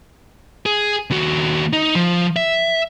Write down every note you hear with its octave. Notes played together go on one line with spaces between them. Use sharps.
G#4
D#2 F#4
D#4
F3
E5